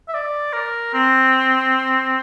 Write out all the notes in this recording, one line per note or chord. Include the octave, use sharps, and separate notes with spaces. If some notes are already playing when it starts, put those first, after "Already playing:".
E5
D5
A#4
C4